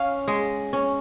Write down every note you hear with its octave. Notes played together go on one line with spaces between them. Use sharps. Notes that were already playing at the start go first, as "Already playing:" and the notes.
Already playing: C#4 F5
G#3
C#4